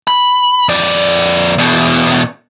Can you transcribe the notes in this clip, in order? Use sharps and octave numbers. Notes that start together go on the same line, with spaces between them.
B5
F2 D5
E2 B2